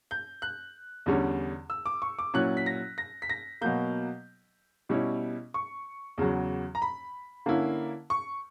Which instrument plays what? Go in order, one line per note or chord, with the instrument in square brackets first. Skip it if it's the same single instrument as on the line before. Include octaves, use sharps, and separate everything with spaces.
[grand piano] G6
F#6
E2 D3 G3 C#4
E6
D6
C#6
D6
A#2 F#3 C#4 E4 F#6
B6
A#6
A#6
B6
A#6
B2 F#3 A#3 G6
B2 G3 C#4 E4
C#6
E2 C#3 F#3
A#5
B5
D3 A#3 C#4 E4
C#6